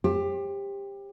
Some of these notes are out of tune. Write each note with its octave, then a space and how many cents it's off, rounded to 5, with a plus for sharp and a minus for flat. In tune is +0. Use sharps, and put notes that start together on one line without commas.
G4 +20 C5 +40